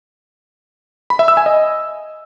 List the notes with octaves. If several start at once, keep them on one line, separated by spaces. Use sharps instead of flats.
B5
E5
E6
G#5
D#5